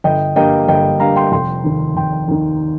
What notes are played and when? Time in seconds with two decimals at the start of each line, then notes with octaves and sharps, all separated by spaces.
0.04 G1 D#5 G5
0.36 G2 G3 A#3 D#5 G5
0.68 G1 D#5 G5
1.00 G2 G3 A#3 F5 A#5
1.16 G5 C6
1.32 F1 G5 C6
1.64 D#2 D#3
1.96 F1 G5 C6
2.28 D#2 D#3